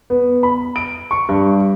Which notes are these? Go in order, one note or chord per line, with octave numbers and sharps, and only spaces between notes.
B3
B5
D7
C#6
G2